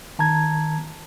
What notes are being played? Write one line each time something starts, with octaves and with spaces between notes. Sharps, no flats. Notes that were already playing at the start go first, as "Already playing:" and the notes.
D#3 A5 A#5 G#6